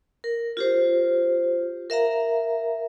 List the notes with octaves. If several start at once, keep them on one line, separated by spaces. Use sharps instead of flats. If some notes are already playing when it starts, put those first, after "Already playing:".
A#4
F4 G4 C5
A#4 E5 F5 A#5